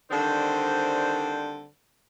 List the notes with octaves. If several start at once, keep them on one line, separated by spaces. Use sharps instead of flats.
D3 D#3 G3 C4 C5